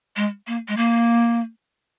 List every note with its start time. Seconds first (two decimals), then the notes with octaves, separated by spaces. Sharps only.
0.16 G#3
0.47 A#3
0.68 G#3
0.77 A#3